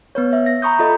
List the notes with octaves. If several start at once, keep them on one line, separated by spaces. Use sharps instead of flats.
B3 B4 C#5
E5
A#6
A#5 B5 C#6 D#6 G6
F4 A4 D#5